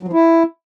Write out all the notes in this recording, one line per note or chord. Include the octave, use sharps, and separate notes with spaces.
F#3
F3
E4